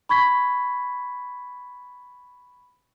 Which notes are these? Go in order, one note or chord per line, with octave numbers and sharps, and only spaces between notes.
B5 C#6 G#6 B6